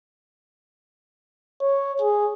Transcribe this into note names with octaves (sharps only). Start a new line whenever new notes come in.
C#5
G#4